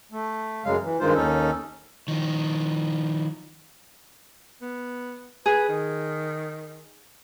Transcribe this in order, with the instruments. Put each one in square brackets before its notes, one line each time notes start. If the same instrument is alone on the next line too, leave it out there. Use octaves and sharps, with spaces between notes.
[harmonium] A3
F#2 C#3 F#3 G#3 F5
E3
G2 D#3 G#3 D#4 F4 C5
D#2 C#4 D#4 A4
[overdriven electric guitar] D#3 F3
[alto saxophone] B3
[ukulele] G#4 [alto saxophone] B4
[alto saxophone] D#3